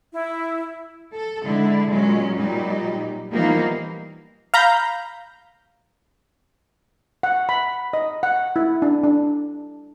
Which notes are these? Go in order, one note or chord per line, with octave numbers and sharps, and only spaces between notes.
E4
A4
D3 G#3 E4
A#2 F#3 G#3 C#4
A#2 F#3 G3 D#4
E3 F3 G3 A#3 B3 D#4
F5 A#5 B5 G6
F#5
B5
D#5
F#5
E4
D4
D4